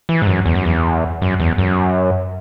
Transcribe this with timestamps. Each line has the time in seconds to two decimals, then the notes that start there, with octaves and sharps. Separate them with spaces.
0.09 E3
0.22 G#2
0.27 F#2
0.46 E2
0.55 F#2
0.65 E2
1.22 F#2
1.40 E2
1.58 F#2